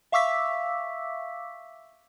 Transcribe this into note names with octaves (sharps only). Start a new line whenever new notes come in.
E5 F5 C#6 D6 E6 B6